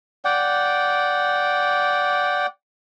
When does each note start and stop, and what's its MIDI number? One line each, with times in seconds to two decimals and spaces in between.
0.25 2.46 74
0.25 2.46 78
0.25 2.46 79